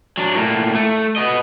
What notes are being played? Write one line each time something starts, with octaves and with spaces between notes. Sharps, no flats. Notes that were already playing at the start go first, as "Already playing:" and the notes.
F#3 D4
A2 A#3
A3
B3 D#5